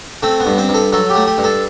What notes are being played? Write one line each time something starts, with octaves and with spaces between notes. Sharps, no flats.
A3 C4
B3
G2
C4
G2
A4
F#3 A4
G4
A3
G4
G2
A4